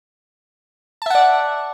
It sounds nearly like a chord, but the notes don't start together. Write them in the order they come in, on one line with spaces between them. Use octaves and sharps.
A5 E5 F#5 D5